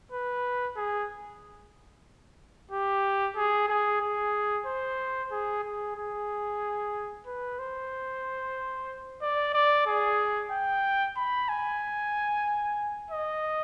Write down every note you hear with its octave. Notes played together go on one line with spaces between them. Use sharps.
B4
G#4
G4
G#4
G#4
G#4
C5
G#4
G#4
G#4
B4
C5
D5
D5
G#4
G5
B5
G#5
D#5